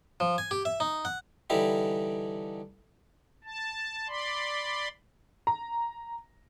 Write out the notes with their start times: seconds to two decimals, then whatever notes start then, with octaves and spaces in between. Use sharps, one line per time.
0.20 F3
0.38 G#5
0.51 G4
0.65 E5
0.80 D#4
1.05 F#5
1.50 D3 E3 G3 D#4 E4 G4
3.44 A5
4.08 D5 B5 C6
5.47 A#5